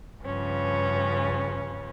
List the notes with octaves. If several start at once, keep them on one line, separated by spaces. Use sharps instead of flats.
G2 C#3 F3 C#4 B4